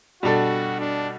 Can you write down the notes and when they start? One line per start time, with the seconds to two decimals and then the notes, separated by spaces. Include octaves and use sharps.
0.22 B2 G3 D4 F#4 A4
0.79 D4